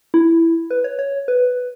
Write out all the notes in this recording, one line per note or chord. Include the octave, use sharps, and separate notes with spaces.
E4
B4
C#5
C#5
B4